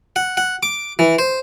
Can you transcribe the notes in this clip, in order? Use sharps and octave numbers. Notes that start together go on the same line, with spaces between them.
F#5
F#5
D6
E3
C5